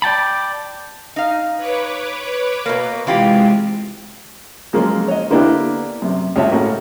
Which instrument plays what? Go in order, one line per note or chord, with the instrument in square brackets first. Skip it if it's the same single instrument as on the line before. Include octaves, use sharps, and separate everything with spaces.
[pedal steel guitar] D5 G5 A5 B5
[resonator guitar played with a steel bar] D#4 F5
[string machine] B4 C#5 D6
[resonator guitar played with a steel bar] B2 A#3
[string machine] C3 G#3 [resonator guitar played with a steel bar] E3 F4 G4
[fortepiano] C#3 F3 F#3 G#3 A#3 C#4
C#5 D#5
D3 A#3 B3 D4 E4 G4
F#2 C3
C#2 G3 C#5 E5 A5
A2 A#3 C#4 F#4